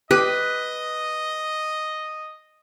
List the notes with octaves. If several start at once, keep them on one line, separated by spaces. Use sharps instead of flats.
G4 B4 D#5